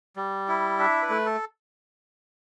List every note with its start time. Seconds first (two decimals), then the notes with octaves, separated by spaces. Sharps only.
0.16 G3
0.48 E4
0.79 D4 E5
1.02 B4
1.10 A3
1.26 A4